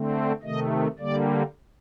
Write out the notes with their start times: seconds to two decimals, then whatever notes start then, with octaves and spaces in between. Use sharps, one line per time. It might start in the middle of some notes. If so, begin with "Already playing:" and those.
Already playing: D3 A3 C4
0.43 C3 D#3 A3 D#5
0.99 D3 G3 A#3 D5